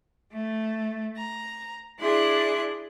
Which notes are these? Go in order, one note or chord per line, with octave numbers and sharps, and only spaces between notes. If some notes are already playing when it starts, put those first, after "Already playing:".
A3
A#5
D4 E4 G#4 C6 F#6